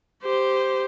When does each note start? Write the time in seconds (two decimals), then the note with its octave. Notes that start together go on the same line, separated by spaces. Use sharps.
0.23 G4 C5